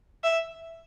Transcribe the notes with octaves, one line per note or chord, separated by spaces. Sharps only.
E5